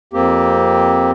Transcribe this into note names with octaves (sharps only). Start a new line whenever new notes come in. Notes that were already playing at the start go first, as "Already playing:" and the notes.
F2 A#3 C4 G4